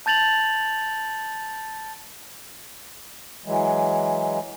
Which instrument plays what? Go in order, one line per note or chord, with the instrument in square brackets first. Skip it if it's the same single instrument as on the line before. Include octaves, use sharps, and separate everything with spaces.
[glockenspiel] A5 G6 A6 F7 F#7
[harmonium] E3 F#3 G#3